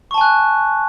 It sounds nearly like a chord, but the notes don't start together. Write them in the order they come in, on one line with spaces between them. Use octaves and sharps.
C#6 A5 G#5 F#6